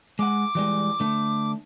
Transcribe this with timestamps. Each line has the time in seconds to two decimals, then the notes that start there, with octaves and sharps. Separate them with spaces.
0.19 G#3 F#5 D6
0.55 E3 G3 G#3
1.00 D3 A3